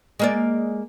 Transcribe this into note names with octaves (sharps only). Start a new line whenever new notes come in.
G#3 A#3 D5